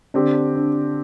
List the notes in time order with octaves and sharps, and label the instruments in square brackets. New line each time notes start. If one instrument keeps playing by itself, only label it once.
[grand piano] D3 C4 G4 [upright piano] D4
[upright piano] D4